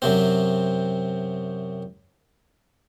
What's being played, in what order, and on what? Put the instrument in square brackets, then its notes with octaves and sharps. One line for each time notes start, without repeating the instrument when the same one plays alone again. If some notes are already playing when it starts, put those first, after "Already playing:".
[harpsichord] F#2 C3 C4